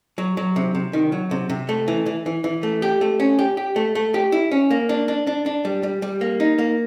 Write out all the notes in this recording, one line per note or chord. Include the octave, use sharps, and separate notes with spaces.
F#3
F#3
C3
C3
D#3
F#3
C3
C3
A3
E3
E3
E3
E3
A3
G4
A3
C#4
G4
G4
A3
A3
G4
E4
C#4
A#3
D4
D4
D4
D4
G3
G3
G3
A#3
D#4
A#3